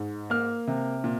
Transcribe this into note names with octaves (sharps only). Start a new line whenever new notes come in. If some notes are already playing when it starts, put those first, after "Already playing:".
Already playing: G#2
A#3 F6
C3
A#2